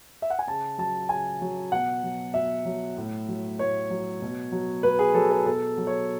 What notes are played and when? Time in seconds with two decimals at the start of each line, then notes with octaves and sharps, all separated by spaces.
0.22 E5
0.30 F#5
0.39 G#5
0.47 C#3 A5
0.78 F#3 A5
1.09 C#3 G#5
1.41 F#3
1.72 B2 F#5
2.03 F#3
2.34 B2 E5
2.65 F#3
2.97 A2
3.29 F#3
3.59 A2 C#5
3.90 F#3
4.22 B2
4.52 F#3
4.83 B2 B4
4.99 G#4
5.14 F#3 A4
5.31 A4
5.45 B2 A4
5.77 F#3
5.87 C#5